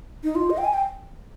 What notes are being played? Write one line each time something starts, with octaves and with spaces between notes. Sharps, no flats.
D#4
F4
D#5
G5
G#5
G5